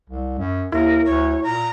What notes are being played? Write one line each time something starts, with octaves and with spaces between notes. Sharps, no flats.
C2
F#2
D#2 E4 A#4
D2 C#5
A#2 A#5